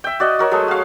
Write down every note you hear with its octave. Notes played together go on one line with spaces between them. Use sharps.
E5 G5
F#4 D5 D#5
F#4 A#4 C#5
F#3 G#3 A3 G#4
F#4 F5